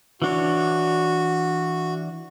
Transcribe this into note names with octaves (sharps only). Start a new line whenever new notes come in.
E3 D4 F#4 C#5